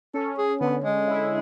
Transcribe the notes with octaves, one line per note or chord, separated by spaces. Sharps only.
C#4 A4
G#4
D3 B3
G#3
E4